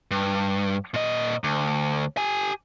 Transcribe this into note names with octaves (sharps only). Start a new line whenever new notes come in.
G2
A#2 D#5
D2
G4 G#5